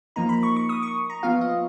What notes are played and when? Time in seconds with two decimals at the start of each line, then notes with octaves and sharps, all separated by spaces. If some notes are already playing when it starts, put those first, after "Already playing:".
0.16 F3 A#3 D#4 A#5
0.29 B5
0.43 C#6
0.57 C#6
0.69 D#6
0.83 C#6
1.10 A#5
1.23 F3 B3 F4 F5
1.41 D#5